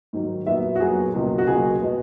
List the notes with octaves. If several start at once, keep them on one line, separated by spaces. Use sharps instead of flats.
G#2 D#3 F#3
A#2 F#3 B3 E5
F#4
A#2 F#3 B3 G#4
C#2 B2 F#3 A#3
F#4
C#2 B2 F#3 A#3 G#4
B2 G#3 B3